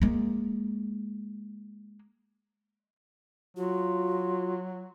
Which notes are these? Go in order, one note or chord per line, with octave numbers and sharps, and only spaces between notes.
G#3 A#3
F#3 F4 F#4